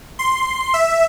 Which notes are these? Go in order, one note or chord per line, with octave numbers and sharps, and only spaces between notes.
C6
E5